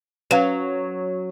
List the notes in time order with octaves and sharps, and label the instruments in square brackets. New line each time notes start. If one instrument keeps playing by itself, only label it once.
[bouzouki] F#3 [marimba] C#4 [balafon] B4 F5